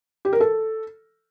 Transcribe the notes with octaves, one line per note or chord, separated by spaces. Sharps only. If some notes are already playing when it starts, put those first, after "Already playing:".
G4
A#4
A4